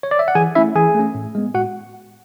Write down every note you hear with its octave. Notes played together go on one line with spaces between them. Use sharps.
C#5
D5
E5
F#5
E3 G#4 G#5
A3 C#4 E4 E5
E3 G#4 G#5
A3 C#4
A2
G#3 B3
A2 F#4 F#5